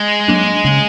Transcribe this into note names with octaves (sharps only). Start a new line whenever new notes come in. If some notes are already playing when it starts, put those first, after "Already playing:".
Already playing: G#3
F#3 A#3 D4
C#3